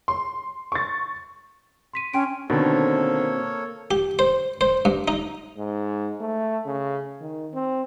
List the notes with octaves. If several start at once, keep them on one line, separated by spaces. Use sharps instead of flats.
C6
C#6 A6
C6 B6 D#7
C#4 G5 C6 D7
B2 D3 D#3 A#3 C4 A4 C#5
G4
C5
C5
G2
D#4
G#2
A3
C#3
D#3
C4